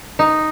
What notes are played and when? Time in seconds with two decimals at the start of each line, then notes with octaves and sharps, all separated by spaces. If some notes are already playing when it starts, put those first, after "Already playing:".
0.19 D#4